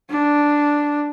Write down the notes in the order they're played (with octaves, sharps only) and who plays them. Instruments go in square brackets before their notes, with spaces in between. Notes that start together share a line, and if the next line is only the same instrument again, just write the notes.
[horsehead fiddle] D4